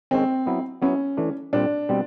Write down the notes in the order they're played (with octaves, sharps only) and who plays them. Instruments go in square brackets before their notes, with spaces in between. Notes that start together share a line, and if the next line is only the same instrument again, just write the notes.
[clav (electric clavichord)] D#3 G#3 C#4 [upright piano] C4
[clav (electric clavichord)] F#3 B3 E4
[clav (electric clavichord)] F#3 B3 E4 [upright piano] C#4
[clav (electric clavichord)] E3 A3 D4
[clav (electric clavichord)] A#2 G3 C4 [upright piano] D4
[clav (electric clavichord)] B2 G3 C4